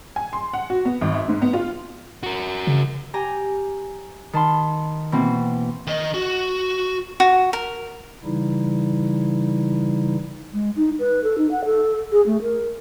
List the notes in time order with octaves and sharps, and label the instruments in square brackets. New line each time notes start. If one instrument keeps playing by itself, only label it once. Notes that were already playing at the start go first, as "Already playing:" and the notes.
[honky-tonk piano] G#5
C6
F#5
F#4
B3
G#1
E5
G#2
B3
F4
[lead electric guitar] F#4 A#4
[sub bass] C#3
[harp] G4 G#5 A#5
D#3 A5 B5 C6
B2 E3 A#3 C4 F#4
[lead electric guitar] D#3 D#5
F#4
[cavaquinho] F#4
A#4
[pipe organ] C#3 E3 G3 D#4 E4
[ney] G#3
D#4
B4
A4
D#4
F#5
A4
G#4
A3
A#4